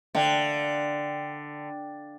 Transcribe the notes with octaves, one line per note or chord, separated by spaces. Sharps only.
D3 F5 G5